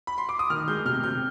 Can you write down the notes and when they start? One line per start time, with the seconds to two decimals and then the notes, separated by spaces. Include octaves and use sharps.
0.07 B5
0.18 C6
0.29 D6
0.39 D#6
0.50 D#3 F6
0.68 G#3 G6
0.85 C3 F6
1.03 C3 G6